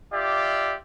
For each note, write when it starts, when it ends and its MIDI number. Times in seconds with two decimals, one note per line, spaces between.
0.13 0.75 65
0.13 0.75 67
0.13 0.75 74
0.13 0.75 76